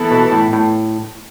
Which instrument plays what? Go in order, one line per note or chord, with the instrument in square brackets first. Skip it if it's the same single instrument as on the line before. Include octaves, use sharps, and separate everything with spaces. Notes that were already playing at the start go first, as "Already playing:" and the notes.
Already playing: [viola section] E3 B3 E4 A4
[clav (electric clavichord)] B2
A2
A2